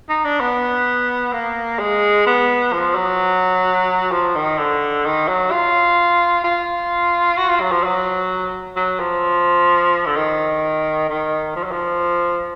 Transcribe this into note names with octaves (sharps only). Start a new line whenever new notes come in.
D#4
D4
B3
A#3
G#3
B3
F3
F#3
F3
D#3
D3
D#3
F#3
F4
F4
F#4
F4
F#3
F3
F#3
F#3
F3
D3
D#3
D#3
F3
F#3
F3